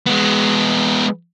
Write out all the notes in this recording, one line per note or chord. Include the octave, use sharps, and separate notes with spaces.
G#3 B3